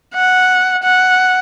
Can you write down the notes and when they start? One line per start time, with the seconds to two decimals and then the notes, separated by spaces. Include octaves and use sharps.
0.15 F#5
0.83 F#5